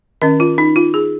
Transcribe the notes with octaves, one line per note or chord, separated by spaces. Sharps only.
D#3 C#4 D#5
F4
D#4
F4
G#4